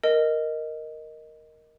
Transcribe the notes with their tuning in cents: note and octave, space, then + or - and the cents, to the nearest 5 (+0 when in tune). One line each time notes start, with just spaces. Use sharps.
A#4 +0 D#5 +0